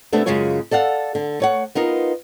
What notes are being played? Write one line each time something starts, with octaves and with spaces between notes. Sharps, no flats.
C3 A3 B3 D4
F#2 C#3 G#3 F4 G#4 C#5
A4 D5 F5 F#5
D3
A3 C#5 F#5
B3 D#4 F4 A#4